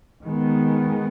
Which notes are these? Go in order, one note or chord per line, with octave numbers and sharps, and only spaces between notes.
D#3 G#3 B3